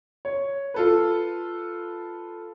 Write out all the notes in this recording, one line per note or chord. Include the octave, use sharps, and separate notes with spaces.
C#5
F4 A4 B4